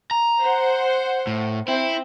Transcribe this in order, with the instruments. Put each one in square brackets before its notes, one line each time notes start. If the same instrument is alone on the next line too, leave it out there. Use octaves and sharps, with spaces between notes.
[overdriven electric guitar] A#5
[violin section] C5 F#5
[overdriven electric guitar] A2
[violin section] C4 [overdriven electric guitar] E4